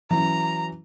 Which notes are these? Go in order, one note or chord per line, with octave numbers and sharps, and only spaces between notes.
E3 F#3 C#4 A#5